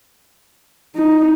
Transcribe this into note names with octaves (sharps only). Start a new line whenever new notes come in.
D#4